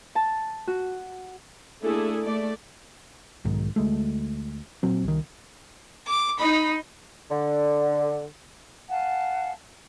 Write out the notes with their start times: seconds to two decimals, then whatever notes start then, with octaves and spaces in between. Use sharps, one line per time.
0.15 A5
0.68 F#4
1.82 A3 A#3 D4 E4 G#4 A4
2.24 A3 D5
3.45 B1 G#2 D#3
3.76 D2 G#3 A3
4.83 A#2 F#3 C4
5.04 C2 D#3
6.06 D6
6.39 D#4 B5
7.30 D3
8.89 F5 F#5 G#5 A5